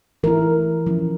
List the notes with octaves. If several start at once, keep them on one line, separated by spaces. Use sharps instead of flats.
E3 A3 E4 A#4
F3 C#4 E4